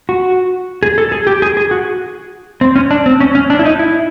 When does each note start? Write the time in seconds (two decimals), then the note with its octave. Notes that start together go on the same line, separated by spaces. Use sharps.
0.09 F#4
0.83 G#4
0.98 A4
1.12 G#4
1.27 G4
1.42 G#4
1.57 G#4
1.71 F#4
2.61 C4
2.76 C#4
2.91 D4
3.06 C4
3.20 C#4
3.35 C#4
3.50 D4
3.59 E4
3.65 D#4
3.79 E4